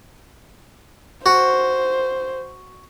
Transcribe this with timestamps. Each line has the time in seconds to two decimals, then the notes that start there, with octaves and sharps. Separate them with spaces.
1.26 F#4 C5